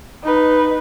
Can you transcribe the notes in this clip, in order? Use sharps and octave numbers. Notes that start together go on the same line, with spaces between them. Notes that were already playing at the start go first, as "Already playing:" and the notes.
D#4 B4